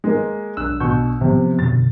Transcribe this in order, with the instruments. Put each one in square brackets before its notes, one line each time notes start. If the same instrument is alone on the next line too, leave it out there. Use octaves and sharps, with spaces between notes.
[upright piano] G#3 A#3
[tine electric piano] B1 D4 E6 [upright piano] F#6
[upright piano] B2 C#6 G6
[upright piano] C3 [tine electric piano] F3 B3
[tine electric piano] F#2 B2 D3 [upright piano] A6